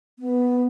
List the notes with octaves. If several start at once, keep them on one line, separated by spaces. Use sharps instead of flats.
B3